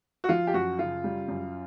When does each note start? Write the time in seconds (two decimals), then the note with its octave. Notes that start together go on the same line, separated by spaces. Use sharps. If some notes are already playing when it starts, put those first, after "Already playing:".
0.24 F#4
0.29 F3 F4
0.47 G4
0.54 F#2 F#4
0.79 C#3 F4
1.04 G3
1.28 F#2